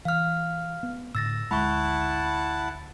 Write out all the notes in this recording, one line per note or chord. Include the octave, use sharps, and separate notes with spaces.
E3 F5 F6
B3
A2 D3 E6 A6 A#6
G#1 D2 G#3 E4 F#5 A5 B5 C#6